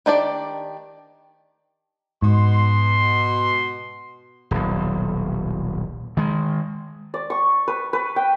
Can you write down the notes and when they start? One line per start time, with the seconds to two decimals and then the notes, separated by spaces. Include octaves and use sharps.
0.06 D#3 D4 G4 D5
2.22 G#2 B2 C6
4.51 D#1 B1
6.17 D#3 G#3
7.14 D5
7.30 C#6
7.68 B4
7.93 B4
8.16 G5